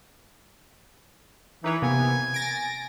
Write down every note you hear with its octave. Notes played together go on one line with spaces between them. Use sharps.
E3 D#4 B4 C#5
C3 A#3 B3 G#5
A6 A#6 D7